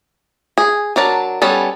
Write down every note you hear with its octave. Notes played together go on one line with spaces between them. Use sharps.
G#4
F#3 D4 A#4 A5
G3 B3 C#4 A4